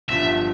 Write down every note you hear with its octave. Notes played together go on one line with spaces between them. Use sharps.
G1 G2 F3 E5